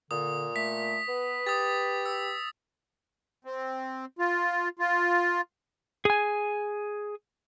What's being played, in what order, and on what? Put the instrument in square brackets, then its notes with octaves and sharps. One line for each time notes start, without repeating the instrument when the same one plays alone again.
[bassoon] A#2 [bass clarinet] D3 [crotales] D#6
[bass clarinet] A3 [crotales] B6
[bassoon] B3 [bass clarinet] B4
[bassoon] G4 [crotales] D#6 A6
[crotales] E6
[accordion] C4
F4
F4
[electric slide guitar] G#4 G#5